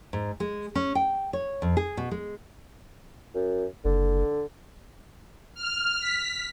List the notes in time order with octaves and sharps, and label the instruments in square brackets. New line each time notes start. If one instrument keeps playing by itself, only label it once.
[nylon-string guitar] G#2
G#3
C#4
G5
C#5
F2
G#4
B2
G#3
[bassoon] F#2
[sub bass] F#1 [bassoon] D3
[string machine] F6
B6